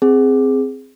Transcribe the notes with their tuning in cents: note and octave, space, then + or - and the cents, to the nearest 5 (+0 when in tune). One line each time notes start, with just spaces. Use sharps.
C4 +0 G#4 +0